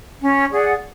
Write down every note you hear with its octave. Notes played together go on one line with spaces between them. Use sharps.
C#4
G#4 D5 F#5